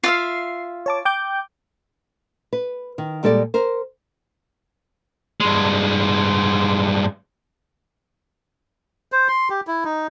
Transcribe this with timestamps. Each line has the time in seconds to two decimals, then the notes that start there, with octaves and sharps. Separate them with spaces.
0.03 F4 E5 F5 C7
0.86 C#5 A5 D6
1.05 G5 D6 G6
2.53 B4
2.98 D#3
3.23 A#2 G3 G#3 A4 C5 D5
3.54 A#4 C5
5.40 G2 G#3
9.12 C5
9.28 C6
9.50 G4
9.67 E4
9.84 D#4